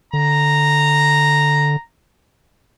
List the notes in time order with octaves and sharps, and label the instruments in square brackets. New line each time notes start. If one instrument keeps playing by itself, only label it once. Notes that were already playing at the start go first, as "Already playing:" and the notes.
[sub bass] D3 [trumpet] A#5